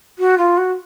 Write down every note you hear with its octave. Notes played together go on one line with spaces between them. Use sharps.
F#4
F4
F#4